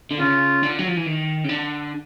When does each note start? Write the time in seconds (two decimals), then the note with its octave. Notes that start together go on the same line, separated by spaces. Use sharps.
0.11 D3
0.20 C#3 F4
0.63 D3
0.79 F#3
0.88 F3
0.97 E3
1.06 D#3
1.44 C#3
1.49 D3